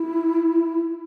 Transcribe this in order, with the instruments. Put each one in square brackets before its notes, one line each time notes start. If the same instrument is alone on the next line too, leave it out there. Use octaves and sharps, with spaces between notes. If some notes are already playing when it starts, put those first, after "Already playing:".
Already playing: [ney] E4